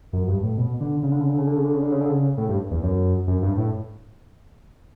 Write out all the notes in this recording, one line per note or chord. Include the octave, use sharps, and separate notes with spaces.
F#2
G2
A2
B2
D3
C#3
D3
C#3
D3
C#3
D3
C#3
D3
C#3
D3
C#3
D3
C#3
A2
G2
E2
F#2
F#2
G2
A2